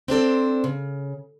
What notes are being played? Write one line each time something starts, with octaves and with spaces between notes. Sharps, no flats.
C4 D4 A4 C5
C#3